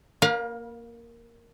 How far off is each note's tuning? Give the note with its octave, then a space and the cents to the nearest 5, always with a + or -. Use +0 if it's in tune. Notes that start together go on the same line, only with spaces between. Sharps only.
A#3 +0 B4 -35 F5 +25